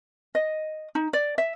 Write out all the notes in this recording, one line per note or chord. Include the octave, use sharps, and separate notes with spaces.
D#5
D#4
D5
E5